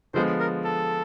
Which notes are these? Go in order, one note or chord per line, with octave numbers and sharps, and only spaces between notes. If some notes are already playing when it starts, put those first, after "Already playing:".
D3 F3 G#3 B3 C5
A#4
A4